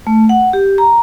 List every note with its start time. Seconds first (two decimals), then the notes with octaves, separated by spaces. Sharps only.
0.07 A3
0.29 F#5
0.53 G4
0.78 A#5